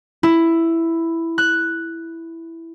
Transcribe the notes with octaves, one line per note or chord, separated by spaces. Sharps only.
E4
F#6